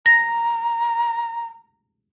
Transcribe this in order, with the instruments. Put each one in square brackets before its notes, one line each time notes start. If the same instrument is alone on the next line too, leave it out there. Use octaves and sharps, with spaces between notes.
[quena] A#5 [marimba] A#6